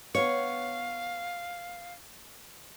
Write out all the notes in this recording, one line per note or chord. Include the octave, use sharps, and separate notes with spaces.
B3 C#5 F5